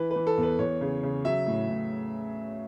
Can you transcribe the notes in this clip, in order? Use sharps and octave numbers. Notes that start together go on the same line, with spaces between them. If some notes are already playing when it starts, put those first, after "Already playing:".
Already playing: E3 B4
B4
E3
A4
E2
B4
E2 C#5
C#3
C#3
F#3 E5
A2
A2